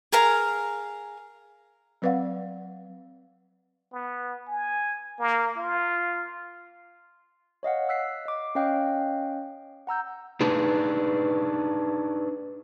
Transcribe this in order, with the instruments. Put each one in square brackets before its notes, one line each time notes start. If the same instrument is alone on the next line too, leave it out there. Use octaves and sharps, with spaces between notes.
[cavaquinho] G#4 A#4 F5 A#5
[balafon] F#3 C4 B4 D5 F5 F#5
[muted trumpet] B3
G#5
A#3
F4
[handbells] C#5 D#5 F5 F#5
E6 F#6 B6 C7
D#5 D6
C#4 C#5 D#5 F5 G5 F#6
F#5 A#5 E6 G6
[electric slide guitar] D4 D#4 G#4 B4